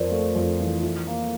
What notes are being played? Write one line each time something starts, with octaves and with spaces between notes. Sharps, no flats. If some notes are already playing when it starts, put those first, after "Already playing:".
Already playing: F2 A#4 C5 D5
A3
F2
E3
E4
A#3